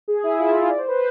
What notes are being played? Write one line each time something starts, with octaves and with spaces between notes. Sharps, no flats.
G#4
E4
F4
D5
C5
B4